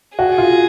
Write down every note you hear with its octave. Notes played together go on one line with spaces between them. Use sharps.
F#4 G#4
F4